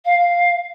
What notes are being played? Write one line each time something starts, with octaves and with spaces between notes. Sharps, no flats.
F5